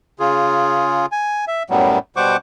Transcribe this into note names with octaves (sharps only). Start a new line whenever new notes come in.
C#3 F4 G#4
G#5
E5
F#2 A2 F#3 G3 B3
B2 G3 C5 F#5 C#6 D6